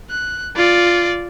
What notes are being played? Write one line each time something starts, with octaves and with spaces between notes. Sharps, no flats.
F#6
F4 D5